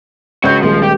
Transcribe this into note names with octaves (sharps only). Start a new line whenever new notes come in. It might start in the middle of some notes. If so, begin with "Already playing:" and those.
C#2 F#4 C#5 G6
D#1 F3 G#3
G4